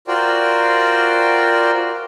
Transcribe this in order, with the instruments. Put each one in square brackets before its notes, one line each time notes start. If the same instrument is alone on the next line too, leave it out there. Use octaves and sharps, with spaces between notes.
[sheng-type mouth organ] F4 F#4 A#4 C5 D5 G5